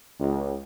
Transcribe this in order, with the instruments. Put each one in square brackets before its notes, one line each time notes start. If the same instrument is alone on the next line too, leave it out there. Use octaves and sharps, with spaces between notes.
[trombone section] C#2